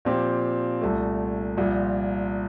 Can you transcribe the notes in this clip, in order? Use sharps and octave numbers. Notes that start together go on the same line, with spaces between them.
A#2 F3 C4 G4
C2 A#2 A3
C2 A#2 F3